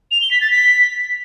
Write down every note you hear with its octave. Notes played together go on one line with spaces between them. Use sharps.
F7
G7
B6
A6
B6